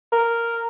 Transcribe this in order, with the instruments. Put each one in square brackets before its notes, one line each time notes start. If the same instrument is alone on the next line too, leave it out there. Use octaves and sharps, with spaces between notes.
[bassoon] A#4